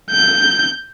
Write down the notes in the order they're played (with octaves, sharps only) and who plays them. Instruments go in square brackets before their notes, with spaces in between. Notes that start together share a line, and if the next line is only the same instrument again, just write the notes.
[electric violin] G6